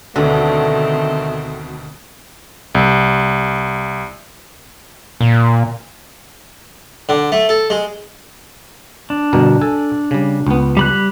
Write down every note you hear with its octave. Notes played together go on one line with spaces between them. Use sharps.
D2 B2 D3 D#3 A3 C4
C2
A#2
D3
A3
A4
G#3
D4
G1 B2 A#4
A4 G#5
C#3 G3
C#2 B3
G3 B5 F#6